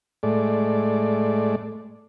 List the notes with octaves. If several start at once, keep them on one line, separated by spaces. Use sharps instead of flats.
A2 G#3 A3 D5